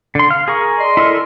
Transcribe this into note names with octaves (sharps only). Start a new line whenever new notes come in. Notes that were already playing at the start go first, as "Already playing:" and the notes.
D3 C6
F5
G#4 A#4 C#6
D5 D#5 C6
E4 A4 A#4